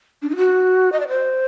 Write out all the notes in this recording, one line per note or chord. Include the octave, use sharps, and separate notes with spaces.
D4
D#4
F#4
D#5
D5
C5